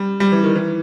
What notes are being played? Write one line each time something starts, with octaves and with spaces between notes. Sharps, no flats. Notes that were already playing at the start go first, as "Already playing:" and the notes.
Already playing: G3
G3
E3
D#3
E3